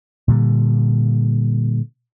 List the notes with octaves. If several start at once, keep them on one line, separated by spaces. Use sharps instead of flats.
A#2 D3 G3